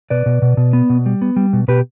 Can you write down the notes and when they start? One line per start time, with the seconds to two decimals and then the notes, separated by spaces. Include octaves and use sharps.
0.10 B2 B4 D5
0.26 B2
0.42 B2
0.57 B2
0.73 B3
0.90 B2
1.06 G3
1.22 B3
1.36 G3
1.53 B2
1.68 B2 G4 B4